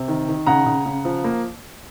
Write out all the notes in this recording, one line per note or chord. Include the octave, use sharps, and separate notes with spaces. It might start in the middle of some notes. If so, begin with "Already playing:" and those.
Already playing: C3
D#3
D#3
C#3 F#5 A#5
C#3
C#3
F3
A#3